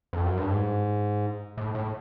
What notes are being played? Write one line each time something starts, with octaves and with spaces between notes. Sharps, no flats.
F2
F#2
G2
G#2
A2
A2